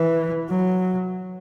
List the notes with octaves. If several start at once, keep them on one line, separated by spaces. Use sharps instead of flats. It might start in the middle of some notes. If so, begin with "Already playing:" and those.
Already playing: E3
F#3